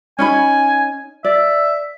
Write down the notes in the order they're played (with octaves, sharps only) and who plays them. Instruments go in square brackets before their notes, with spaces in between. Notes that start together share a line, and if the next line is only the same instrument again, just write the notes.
[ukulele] C#4 D#4 B5 [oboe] G#5
[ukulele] D5 [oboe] E5